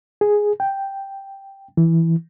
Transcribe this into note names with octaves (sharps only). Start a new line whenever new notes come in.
G#4
G5
E3